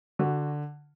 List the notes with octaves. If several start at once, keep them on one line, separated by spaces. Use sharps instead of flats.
D3 F#4